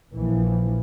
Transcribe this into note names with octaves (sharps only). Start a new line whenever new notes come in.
A#1 E3 F3